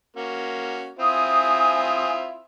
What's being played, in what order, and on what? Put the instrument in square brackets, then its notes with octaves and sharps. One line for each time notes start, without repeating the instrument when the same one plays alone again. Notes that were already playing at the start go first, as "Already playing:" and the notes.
[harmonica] A#3 C#4 F#4
[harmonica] C4 E4 F4 [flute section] G#5 D#6